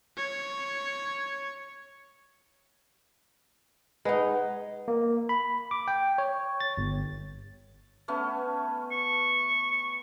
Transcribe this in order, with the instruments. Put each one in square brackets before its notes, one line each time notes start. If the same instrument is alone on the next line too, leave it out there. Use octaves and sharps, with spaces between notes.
[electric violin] C#5
[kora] G#3 D#4 [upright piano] B4 F#5
[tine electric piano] A#3
B5
D6
G5
C#5
A6
G1
[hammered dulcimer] A3 B3 C#4
[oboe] C#6